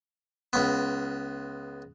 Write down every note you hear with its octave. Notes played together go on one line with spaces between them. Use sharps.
C#2 B3